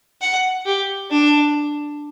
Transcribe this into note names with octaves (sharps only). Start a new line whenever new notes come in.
F#5
G4
D4